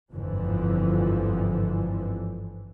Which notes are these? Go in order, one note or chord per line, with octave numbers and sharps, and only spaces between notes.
G1 F2 G#2 D3 E3 F3